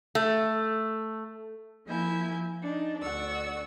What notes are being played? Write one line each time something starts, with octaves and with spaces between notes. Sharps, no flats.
A3
F3 A#3 E4 E5 G#5 G6
D4 D#4
D2 D5 F#5 C#6 E6